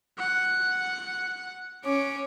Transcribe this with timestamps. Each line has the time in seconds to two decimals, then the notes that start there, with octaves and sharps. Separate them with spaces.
0.19 F#5
1.85 C#4 D6